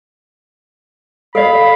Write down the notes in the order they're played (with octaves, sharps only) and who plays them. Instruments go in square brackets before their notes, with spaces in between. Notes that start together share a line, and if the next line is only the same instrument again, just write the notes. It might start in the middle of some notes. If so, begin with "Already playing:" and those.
[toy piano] A4 D#5 [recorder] F5 [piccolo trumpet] B5